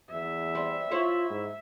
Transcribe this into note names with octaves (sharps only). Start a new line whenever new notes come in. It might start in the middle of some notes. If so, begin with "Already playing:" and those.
E2 E5
G3 C4
E4 F4 C5 C#5
G#2